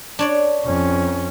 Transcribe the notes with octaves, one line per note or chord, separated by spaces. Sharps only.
D4 C#5 D5
F2 C#4